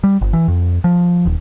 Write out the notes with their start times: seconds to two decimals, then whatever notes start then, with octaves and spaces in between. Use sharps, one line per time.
0.04 G3
0.21 G1
0.33 E3
0.48 F2
0.84 F3
1.26 D#1